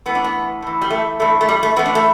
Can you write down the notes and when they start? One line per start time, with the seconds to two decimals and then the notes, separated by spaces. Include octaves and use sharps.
0.06 A2 E3 B3
0.15 D4
0.24 B3
0.62 A2 E3
0.81 G3
0.90 A3
1.20 G2 E3 A3
1.41 A3
1.49 G3
1.63 A3
1.76 A2 E3 B3
1.86 D4
1.95 A3